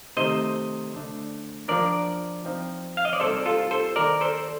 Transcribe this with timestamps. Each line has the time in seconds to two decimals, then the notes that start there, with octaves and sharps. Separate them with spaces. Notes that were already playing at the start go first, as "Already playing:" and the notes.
0.17 C3 D#3 A3 D#4 C5 D#5
0.92 D3 A3 D4
1.68 F3 A#3 D4 A#4 D5
2.45 F3 C4 D#4
2.97 F5
3.05 D#5
3.13 D5
3.20 C3 G3 A#3 D#4 A4 C5
3.46 F4 A4
3.71 A4 C5
3.96 D#3 A#3 D#4 A#4 D5
4.21 A4 C5